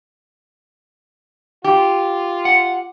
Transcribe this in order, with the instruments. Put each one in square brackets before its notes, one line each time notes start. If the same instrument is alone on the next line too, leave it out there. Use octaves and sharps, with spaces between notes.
[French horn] F4 [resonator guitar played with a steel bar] G4
[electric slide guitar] F#5